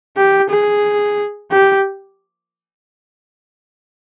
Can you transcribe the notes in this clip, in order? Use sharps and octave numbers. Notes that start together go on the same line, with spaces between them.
G4
G#4
G4